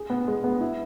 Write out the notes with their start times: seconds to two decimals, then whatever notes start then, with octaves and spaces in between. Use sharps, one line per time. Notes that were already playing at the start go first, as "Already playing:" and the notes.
Already playing: G#4
0.10 B3
0.28 G#3
0.44 B3
0.61 E4